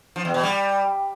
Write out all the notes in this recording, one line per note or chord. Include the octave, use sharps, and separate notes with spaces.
F3
E2
B2
G3